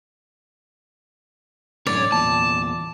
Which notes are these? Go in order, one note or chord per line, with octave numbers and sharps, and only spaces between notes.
F#2 A2 D3 C#5 D5
E2 A#2 A5